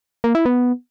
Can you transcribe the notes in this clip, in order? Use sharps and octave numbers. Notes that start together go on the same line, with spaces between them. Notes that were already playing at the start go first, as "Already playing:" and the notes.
A#3
E4
B3